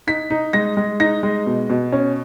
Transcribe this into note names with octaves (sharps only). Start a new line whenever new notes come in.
D#4 B6
D#4
G#3 A#6
G#3
D#4 A#6
G#3
B2
B2
C#4